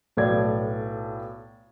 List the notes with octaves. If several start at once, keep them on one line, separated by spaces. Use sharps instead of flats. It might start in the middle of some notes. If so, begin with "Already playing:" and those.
B1 A2 B3 D5 G#6